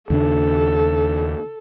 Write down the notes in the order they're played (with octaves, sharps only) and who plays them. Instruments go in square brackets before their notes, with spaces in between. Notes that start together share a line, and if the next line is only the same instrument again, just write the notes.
[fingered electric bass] D#2 C#3 D4 [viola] A4